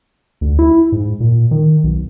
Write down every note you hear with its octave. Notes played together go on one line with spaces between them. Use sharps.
D2
E4
G#2
A#2
D#3
B1